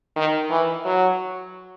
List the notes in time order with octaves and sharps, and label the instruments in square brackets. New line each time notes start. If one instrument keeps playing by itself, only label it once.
[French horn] D#3
E3
F#3